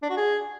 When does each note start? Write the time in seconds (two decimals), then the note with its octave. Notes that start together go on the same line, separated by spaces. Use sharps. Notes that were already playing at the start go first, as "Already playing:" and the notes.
0.03 D4
0.10 F#4
0.17 G#4